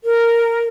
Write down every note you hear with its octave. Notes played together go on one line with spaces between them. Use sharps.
A#4